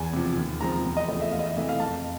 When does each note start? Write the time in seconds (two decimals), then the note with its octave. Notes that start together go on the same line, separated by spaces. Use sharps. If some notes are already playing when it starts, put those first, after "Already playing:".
Already playing: E2 G#5
0.13 C3 F3
0.37 D#2
0.61 C#3 F3 G#3 C4 A#5
0.85 E2
0.97 D#5
1.08 C#3 F3 A3 D#5
1.21 E5
1.32 E2 F5
1.39 D#5
1.44 E5
1.56 C3 E3 A3 E5
1.69 F5
1.80 F2 A5